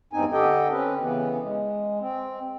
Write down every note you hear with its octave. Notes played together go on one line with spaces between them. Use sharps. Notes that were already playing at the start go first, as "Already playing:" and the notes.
E2 G2 C4 D#4 G#5
D3 G4 A4 D#5 G5
C4 C#4 B4
C#3 E3 B3
G#3
C4